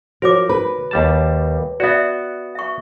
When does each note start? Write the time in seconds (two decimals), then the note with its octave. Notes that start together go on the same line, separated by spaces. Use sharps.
0.22 F3 F#4 A#4 C#5 D6
0.49 B4
0.91 D#2 G3 A5
1.80 B3 F#4 D5 E5
2.55 E5 C#6